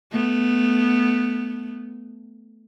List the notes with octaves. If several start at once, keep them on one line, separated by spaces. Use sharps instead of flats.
A3 B3